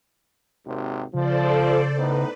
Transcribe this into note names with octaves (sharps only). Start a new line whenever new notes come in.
G#1 D#2 C3
C#3 F3 A4 C5 D5
A2 B3 D#4 B4